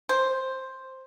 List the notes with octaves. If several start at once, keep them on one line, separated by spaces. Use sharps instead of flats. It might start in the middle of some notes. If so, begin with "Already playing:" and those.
C5